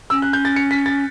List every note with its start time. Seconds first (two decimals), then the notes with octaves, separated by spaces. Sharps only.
0.10 C#4 E6
0.22 F#6
0.33 G6
0.45 A6
0.56 C#7
0.71 B6
0.86 A6